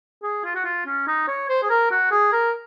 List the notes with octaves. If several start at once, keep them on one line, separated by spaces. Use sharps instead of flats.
G#4
F4
F#4
F4
C#4
D#4
C#5
C5
G#4
A#4
F#4
G#4
A#4